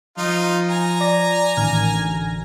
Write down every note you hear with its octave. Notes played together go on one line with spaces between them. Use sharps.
F3 D#4 F4
G#5 A#5
D5 A#6
A1 D#3 F6
D2